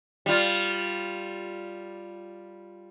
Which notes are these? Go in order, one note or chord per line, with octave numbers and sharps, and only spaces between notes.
G3 F4